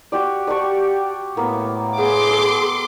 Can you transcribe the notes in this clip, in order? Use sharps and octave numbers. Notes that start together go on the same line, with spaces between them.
F#4 G4 D5
G4 D5 A5 C#6
A2 A#3 B3
B3 G#4 C6 D6
A4